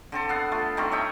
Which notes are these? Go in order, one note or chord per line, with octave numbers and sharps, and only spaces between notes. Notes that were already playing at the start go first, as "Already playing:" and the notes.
D3 C4 A4
B3 F5 F#5
A3 F4
D#3 G3 A3 C4
C#5 D#5 E5 G5